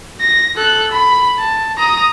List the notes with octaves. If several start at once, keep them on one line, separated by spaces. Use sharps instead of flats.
A#6
A4 F#6
B5
A5
A#5 D#6